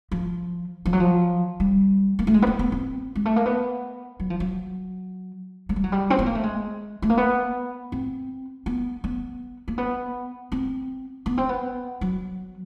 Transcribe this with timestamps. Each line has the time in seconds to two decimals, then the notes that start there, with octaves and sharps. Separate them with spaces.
0.12 F3
0.86 F3
0.93 F#3
1.00 F3
1.60 G3
2.19 A#3
2.27 A3
2.34 G#3
2.42 B3
2.47 A#3
2.59 B3
2.72 C4
3.15 G#3
3.25 A3
3.36 A#3
3.45 B3
4.20 F#3
4.30 F3
4.40 F#3
5.69 G#3
5.76 G3
5.84 F#3
5.92 G3
6.10 C4
6.19 B3
6.26 A#3
6.35 A3
6.43 G#3
7.02 A3
7.10 A#3
7.17 B3
7.92 C4
8.66 B3
9.04 B3
9.68 A#3
9.78 B3
10.52 C4
11.26 B3
11.38 C4
11.49 B3
12.01 F#3